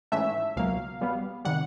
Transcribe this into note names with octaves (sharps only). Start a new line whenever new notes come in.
G#2 E3 A3 C#4 E5
C#2 B2 F#3 A#3 F5
B2 G3 B3
C3 D#3 G3 F#5